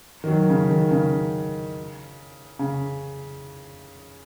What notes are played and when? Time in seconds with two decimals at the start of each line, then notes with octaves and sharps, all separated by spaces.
0.24 D#3
0.28 F#3
0.49 C#3
0.70 D#3
0.91 C#3
2.59 C#3